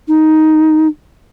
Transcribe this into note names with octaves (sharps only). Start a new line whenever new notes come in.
D#4